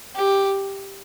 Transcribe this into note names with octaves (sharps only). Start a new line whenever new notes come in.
G4